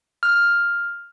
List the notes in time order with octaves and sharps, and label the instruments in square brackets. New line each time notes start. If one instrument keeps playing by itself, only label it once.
[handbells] F6